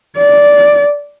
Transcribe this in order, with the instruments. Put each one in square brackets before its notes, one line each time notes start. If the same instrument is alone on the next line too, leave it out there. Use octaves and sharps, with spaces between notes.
[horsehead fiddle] D5